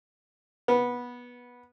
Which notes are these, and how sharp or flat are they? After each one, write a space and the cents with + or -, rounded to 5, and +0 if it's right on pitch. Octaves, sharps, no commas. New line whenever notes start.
B3 -15